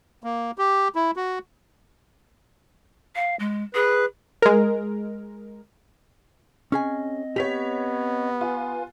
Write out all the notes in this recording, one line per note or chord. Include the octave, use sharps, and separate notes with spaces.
A#3
G4
E4
F#4
F5
G#3
G#4 B4
G#3 A#4
C4 C#4 G#4 D#5 G#5
B3 G4 C#5 B6 F7
F4 B4 G#5